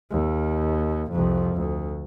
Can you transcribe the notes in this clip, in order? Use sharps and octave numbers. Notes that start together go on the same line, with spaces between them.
D#2
C2 F2
D2